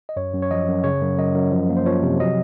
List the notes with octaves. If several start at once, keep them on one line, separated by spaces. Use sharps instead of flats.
D#5
F#2 C#5
F#2
C#5
F3 D#5
F#2
C#3 C#5
F#2
F#2 D#5
F#2
F3
A#3
C5
F3 C#5
C3
F#3 D#5